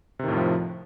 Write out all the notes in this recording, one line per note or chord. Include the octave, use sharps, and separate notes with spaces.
F2 A2 C3 D#3 F3